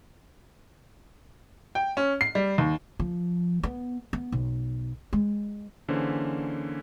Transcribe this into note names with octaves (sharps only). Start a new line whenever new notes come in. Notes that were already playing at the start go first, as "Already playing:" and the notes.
G5
C#4
C7
G3
D#2
F3
B3
B3
B1
G#3
D3 E3 A#3 C#4 G#4 C5